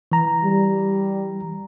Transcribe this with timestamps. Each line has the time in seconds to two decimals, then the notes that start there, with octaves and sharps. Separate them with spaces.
0.12 E3 A#5
0.43 G3